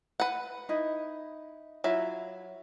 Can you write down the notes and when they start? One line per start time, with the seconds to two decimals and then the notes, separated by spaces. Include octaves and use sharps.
0.20 B4 F#5
0.69 D#4 E4
1.84 F#3 E4 F4 E5